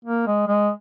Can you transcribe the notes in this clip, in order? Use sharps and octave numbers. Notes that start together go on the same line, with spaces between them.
A#3
G#3
G#3